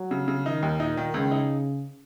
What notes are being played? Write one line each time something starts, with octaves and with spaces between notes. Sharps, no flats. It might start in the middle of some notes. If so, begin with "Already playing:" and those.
Already playing: F#3
C#3
C#3
D#3 D#4
D#2
A#2 D#4
D#3
C#2 C#3
D#4